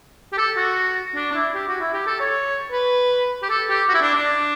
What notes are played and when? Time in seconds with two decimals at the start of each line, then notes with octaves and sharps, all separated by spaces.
0.33 G4
0.38 A4
0.57 F#4
1.15 D4
1.31 D4
1.34 E4
1.54 G4
1.68 F#4
1.80 E4
1.94 G4
2.07 A4
2.20 C#5
2.72 B4
3.42 G4
3.50 A4
3.69 G4
3.89 F#4
3.94 E4
4.01 D4
4.14 D4